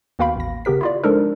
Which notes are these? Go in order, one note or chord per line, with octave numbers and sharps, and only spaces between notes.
D#2 B3 F#4 F5 G5 B5
A1 A#6
C#3 B3 G4 A#4 B6
E4 F4 D5
F3 G#3 D4 D#4 A4 A#4